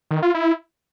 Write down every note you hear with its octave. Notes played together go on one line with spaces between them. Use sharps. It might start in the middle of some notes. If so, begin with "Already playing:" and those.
D#3
F4
E4